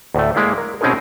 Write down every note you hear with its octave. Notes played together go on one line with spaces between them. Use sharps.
D2 A2 A3
G#3 A#3 E4 D5 F5
A#4
B2 C4 C#4 D#4 G#4 A#4